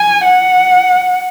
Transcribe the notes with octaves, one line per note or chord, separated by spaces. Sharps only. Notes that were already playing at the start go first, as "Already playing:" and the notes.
Already playing: G#5
F#5